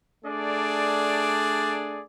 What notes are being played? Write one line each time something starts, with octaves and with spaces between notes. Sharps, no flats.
A3 D4 G#4 D5